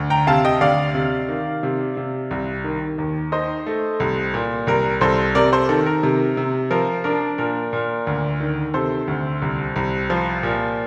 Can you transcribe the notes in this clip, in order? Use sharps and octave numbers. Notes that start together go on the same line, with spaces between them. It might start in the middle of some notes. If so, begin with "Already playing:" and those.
Already playing: D2
G5 A#5
C3 F5 A5
D#5 G5
D2 D5 F5
C3
D#3
C3
C3
C2
D#3
D#2
D#4 C5 D#5
A3
C2
A#2
C2 A#4
C2 A4 C5
C3 A#4 D5
A4 C5
D#3 A4
A#4
C3
C3
F3 A#4
D4 A#4
A#2 A#4
A#2
D2
D#3
C3 A4 C5
D2
C2
C2
F3
A#2